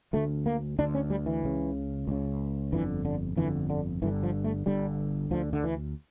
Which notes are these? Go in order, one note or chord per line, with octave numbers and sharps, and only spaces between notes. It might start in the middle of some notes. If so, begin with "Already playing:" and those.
D2 D3 A3
A#3
D2 D3 D4
C#4
G3
E3
C#2 C#3
C#2 C#3
G1 F2 D3 E3
D3
G1 F2 D3 E3
D3
G1 G2 D3 E3
F3
A3
G1 G2 D3 G3
D2 D3 F3
D3
E3